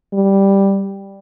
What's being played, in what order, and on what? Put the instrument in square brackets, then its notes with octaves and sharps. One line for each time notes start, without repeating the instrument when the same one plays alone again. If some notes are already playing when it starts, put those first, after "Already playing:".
[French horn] G3